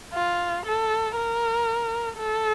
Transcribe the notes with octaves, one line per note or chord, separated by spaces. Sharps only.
F4
A4
A#4
A4